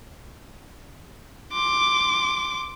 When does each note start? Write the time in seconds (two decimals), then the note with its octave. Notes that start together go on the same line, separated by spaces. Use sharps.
1.53 C6 D6